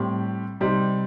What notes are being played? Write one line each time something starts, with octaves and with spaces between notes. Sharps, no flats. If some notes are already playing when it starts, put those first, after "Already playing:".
Already playing: A2 G3 C4 G4
C3 G3 C4 D#4